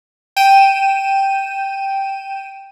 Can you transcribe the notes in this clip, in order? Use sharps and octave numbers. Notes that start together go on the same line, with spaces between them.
G5 D#7 E7